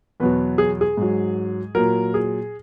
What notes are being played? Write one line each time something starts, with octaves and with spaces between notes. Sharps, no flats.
E2 B2 F#3 B4
G#4
G#4
G#2 F#3
A#2 F#3 A#4
G#4